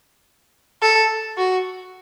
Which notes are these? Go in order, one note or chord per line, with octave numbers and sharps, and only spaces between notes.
A4
F#4